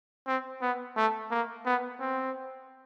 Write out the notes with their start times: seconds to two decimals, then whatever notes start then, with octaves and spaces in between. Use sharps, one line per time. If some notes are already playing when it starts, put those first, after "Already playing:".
0.27 C4
0.62 B3
0.97 A3
1.31 A#3
1.66 B3
2.00 C4